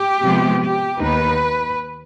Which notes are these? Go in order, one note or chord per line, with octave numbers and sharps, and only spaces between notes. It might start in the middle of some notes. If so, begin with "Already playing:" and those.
Already playing: G4
C3 F3 G#3 B3
G4
D#2 D#3 B3 D#4 B4